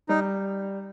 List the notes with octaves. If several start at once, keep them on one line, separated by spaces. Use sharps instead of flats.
G3 D#4